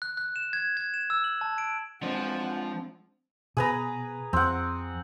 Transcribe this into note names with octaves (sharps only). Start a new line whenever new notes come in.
F#6
F#6
E7
G#6
G#6
E7
E6
F#7
A5
D7
F3 G#3 C4 D4 F#5
B2 G#4 B4 A#5
F2 C4 F#5